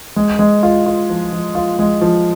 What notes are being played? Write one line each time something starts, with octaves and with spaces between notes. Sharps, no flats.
G#3
G#3
F4
F4
F3
F3
F4
G#3
F3